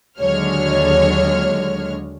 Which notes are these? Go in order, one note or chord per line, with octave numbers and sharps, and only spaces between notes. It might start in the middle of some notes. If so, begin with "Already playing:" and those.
D#2 D3 F#3 G#3 C#5 F6